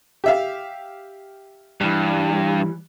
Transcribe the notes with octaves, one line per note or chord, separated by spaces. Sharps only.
G4 E5 F5
G2 E3 G3